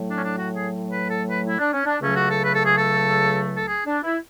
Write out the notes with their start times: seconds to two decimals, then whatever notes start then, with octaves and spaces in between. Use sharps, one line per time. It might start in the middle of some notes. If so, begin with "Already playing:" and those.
Already playing: A2 F#3 A3
0.08 D4
0.17 C#4
0.21 D4
0.34 F#4
0.53 G#4
0.90 B4
1.08 A4
1.27 B4
1.46 E4
1.58 D4
1.73 C#4
1.85 D4
2.00 C#2 C#3 F#3 A3 C#4
2.15 F#4
2.29 A4
2.42 B4
2.53 A4
2.64 G#4
2.75 A4
3.55 A4
3.66 G#4
3.85 D4
4.03 E4